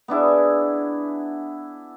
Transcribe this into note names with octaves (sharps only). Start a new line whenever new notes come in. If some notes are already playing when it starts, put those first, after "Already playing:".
B3 D4 E4 G#4